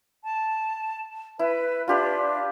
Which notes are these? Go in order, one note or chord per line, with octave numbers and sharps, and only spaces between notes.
A5
E4 B4
D4 F4 G4 B4